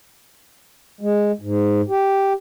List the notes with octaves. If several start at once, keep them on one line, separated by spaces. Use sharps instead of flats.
G#3
G#2
G4